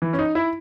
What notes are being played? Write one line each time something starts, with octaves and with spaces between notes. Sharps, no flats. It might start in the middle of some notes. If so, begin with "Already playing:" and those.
E3
C#4
D#4
E4